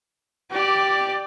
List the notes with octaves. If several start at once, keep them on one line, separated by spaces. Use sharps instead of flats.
G4 D5